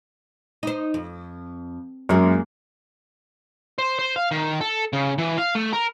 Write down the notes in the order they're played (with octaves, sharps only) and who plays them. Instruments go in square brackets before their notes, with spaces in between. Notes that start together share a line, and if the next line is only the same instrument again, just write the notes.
[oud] D#4 C5
F2
[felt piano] F#2 [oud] G#3 A#3
[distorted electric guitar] C5
C5
F5
D#3
A4
C#3
E3
F5
A3
A#4